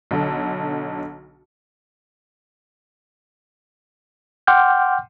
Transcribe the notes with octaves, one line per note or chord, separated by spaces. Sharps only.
B1 D3 A4
F#5 G5 C6 D6 F6 G6